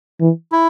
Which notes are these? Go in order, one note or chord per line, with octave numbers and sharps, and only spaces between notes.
E3
E4